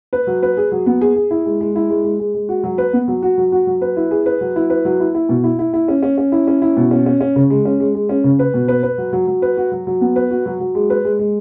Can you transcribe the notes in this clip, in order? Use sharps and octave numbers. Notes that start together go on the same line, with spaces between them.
B4
F#3
B4
G#4
F#3
B3
G#4
G#4
E4
G#3
G#3
E4
G#3
G#3
G#3
G#3
F#4
F#3
B4
B3
F#3
F#4
F#3
F#4
F#3
B4
E4
G#4
B4
F#3
E4
B4
F#3
E4
E4
B2
E4
E4
E4
C#4
C#4
C#4
E4
C#4
E4
B2
C#4
C#4
C#4
C#3
G#3
C#4
G#3
G#3
C#4
C#3
B4
B2
B4
B4
F#3
F#3
F#3
B4
F#4
F#3
F#3
B3
B4
F#4
F#3
F#3
G#3
B4
G#3
G#3